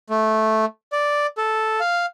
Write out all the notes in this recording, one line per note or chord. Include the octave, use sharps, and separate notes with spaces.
A3
D5
A4
F5